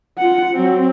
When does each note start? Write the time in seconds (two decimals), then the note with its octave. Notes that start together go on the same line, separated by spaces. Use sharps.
0.18 F4 F#5
0.53 F#3 C4